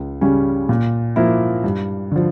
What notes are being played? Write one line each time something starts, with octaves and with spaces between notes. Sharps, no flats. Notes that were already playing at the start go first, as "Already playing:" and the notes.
Already playing: C#2
C#3 G3 C#4
A#2
F3 A#3 E4
G2
D3 F3